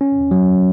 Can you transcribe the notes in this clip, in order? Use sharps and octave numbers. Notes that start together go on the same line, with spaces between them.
C#4
F#3